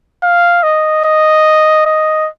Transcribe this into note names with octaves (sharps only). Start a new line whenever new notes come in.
F5
D#5
D#5
D#5